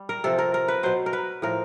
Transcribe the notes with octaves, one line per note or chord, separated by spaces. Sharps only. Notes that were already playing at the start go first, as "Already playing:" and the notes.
Already playing: G3
A#4
C3 F3 A4
A#4
A#4
B4
B2 F#3 C5
A#4
B4
A2 F3 A#4